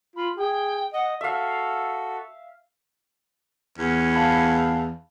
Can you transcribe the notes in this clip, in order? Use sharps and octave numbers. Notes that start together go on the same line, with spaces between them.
F4 B5
G#4 G5
D#5 F#5
F#4 A4 E5 F5
E2 C#4
F5 A5 B5